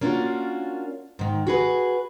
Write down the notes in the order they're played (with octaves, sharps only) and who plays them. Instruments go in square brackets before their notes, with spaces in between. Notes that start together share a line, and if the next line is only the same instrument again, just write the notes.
[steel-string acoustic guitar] A#3 C#4 D4 F4 F#4
G#2 D#3
F#4 G#4 B4